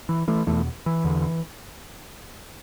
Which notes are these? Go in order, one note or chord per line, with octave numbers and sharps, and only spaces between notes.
E3
E3 A3
E2 B2 E3 A3
E3
E2 D3